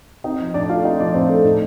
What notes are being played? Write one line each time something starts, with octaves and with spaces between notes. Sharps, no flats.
C4 D#4 D#5
F3
A2 D4 D5
A3 F4 F5
C4 D#4 D#5
F3 D4 D5
A2 C4 C5
A3 A4
A2 D#4